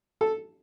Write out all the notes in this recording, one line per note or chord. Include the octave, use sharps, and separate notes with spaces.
A4